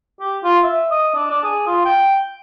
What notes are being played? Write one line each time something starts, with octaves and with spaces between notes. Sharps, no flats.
G4
F4
E5
D#5
D4
D4
G#4
F4
G5